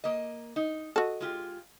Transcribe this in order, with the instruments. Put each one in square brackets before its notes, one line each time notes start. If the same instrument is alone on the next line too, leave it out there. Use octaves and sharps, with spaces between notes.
[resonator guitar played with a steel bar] A#3 D#5
D#4
[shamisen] F#4 A4 [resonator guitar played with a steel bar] D#5
[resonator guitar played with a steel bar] G#3 F4 G4